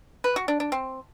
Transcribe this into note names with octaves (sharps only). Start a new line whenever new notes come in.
B4
F#4
D4
D4
C4